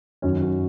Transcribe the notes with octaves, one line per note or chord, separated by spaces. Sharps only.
F#2 D#3 F#3 C#4 F#4
C#4 F#4